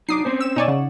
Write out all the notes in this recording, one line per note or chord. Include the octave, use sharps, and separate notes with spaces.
F#3 D4 D#4 D6 D#6 C7
C4 C#4 C5
E6 E7
B2 D#4 C#5 D5 G#5
C#3 F#5